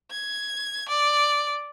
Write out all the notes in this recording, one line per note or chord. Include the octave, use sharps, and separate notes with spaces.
G#6
D5